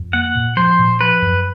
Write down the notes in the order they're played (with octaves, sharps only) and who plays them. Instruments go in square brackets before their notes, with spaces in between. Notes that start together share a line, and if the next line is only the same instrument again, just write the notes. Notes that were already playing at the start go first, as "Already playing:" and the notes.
Already playing: [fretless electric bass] F2
[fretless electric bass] A#3 [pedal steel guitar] F#5
[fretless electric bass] A#2
[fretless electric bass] F3 [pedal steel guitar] C5
[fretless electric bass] A#2
[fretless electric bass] F3 [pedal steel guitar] B4
[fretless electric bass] F#2